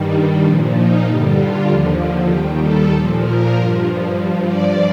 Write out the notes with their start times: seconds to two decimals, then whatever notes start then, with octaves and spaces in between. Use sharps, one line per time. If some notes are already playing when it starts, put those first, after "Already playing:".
Already playing: G2 D#3 G3
0.43 A#2 F3 D4
0.75 D#4
1.06 G2 D3 G3
1.36 F4
1.68 D#2 D3 F3
2.29 D#2 D#3 G3 G4
2.61 A4
2.91 A#2 F3
3.23 A#4
3.55 G2 F3
4.15 G2 F3
4.46 D5